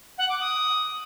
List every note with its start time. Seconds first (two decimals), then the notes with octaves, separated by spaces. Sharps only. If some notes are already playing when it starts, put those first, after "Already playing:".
0.18 F#5
0.29 D6
0.40 D#6